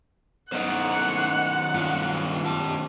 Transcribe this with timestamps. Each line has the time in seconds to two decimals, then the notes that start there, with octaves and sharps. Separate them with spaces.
0.52 B1 D#3 C5 D#5 F#5
1.74 G2 F4
2.45 G4 A5